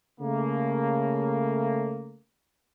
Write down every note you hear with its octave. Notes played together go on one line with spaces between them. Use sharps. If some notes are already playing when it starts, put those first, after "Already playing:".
C#3 A3 A#3